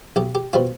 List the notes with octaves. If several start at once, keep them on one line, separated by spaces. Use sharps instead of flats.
B1 G4
G4
B2 G3 C4 F4